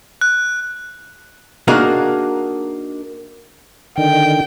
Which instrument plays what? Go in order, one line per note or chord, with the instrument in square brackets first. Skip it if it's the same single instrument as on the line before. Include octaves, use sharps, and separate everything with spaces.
[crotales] F#6
[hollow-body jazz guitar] A#3 D4 D#4 F#4 G#4 A#4
[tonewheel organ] D3 D#3 [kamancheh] G5